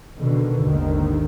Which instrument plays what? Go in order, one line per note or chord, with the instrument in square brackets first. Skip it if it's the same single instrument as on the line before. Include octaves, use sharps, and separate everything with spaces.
[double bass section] B2 D3 D#3
G#1 D#2 D3 D#3